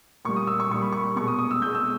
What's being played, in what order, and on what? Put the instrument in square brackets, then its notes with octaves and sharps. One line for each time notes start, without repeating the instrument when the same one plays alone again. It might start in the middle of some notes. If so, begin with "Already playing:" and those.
[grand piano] A#2 G3 C#6
D#6
E6
C#6
A#2 G3 C#6
B5
C#6
B2 G#3 C#6
D#6
D#6
E6
B2 G#3 G6
E6